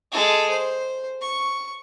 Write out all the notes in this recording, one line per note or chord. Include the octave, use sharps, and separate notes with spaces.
G#3 A4
C5
C#6